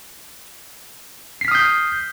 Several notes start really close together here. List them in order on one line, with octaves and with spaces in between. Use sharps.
C7 B6 F6 D#6 G6